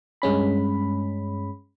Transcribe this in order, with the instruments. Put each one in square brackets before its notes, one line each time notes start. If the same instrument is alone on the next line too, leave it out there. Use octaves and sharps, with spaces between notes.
[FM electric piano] G2 G#3 C#4 B5